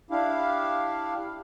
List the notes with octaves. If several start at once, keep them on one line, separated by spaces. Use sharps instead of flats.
D4 E4 G4 F5